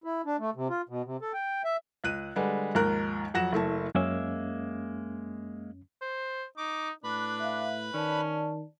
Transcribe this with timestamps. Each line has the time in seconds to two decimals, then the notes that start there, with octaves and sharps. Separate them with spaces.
0.04 E4
0.26 D4
0.39 A3
0.55 C3
0.70 F4
0.89 B2
1.05 C3
1.22 A4
1.33 G5
1.64 E5
2.04 C#2 F#6 D#7
2.36 D3 G3 G#3 B4
2.75 D#2 G#2 F3 A#4 F#6
3.34 F2 F#3 F#5 F#6 A#6 E7
3.53 F#1 A3 E4 A5
3.95 F#2 G#3 A#3 C#4 E5
6.02 C5
6.57 D#4 D6
7.04 A2 D4 B4 B5
7.40 E5 F5
7.94 D#3 C#4 D5 A5